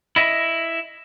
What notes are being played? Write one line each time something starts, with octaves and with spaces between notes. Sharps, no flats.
E4 D#5 E5